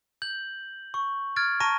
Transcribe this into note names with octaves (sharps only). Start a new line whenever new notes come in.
G6 F#7
C#6
F6 G#6 A6 D7
A5 A#5 C#6 A#6 D#7